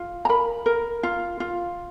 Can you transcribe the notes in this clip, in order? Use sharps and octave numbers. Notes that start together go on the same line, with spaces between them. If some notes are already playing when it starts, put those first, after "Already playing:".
Already playing: F4
A#5
A#4 B5
A#4
F4
F4